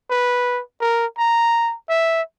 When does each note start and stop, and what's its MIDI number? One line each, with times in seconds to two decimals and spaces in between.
0.10 0.61 71
0.81 1.06 70
1.19 1.74 82
1.89 2.22 76